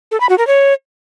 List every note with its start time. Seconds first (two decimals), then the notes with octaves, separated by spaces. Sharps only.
0.11 A4
0.20 B5
0.29 F#4
0.38 A#4
0.47 C#5